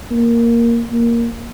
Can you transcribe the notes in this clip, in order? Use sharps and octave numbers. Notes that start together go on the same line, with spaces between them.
A#3
A#3